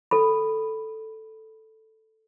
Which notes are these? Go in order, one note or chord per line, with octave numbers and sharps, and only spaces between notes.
A4 B5